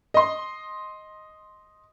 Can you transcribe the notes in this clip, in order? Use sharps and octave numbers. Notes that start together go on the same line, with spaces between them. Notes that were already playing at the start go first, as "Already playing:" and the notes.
D#5 C6